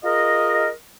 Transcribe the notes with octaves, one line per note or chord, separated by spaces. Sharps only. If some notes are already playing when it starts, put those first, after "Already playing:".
F4 G#4 A#4 D#5